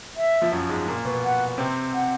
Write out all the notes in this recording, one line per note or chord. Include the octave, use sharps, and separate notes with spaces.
E5
F3
F#2 F#3
G#2 G#3
A#2 A#3
B2 B3
F#5
C3 C4
F#5